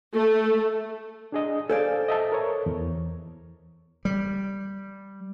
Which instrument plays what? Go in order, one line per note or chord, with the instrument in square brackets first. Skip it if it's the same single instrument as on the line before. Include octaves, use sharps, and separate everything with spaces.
[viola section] A3
[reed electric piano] D4 G#4 D#5
[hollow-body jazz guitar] A4 C5 D5 [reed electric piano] F5 G#5
[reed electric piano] D#5 E5 A5
A#4 C#5
E2
[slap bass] G3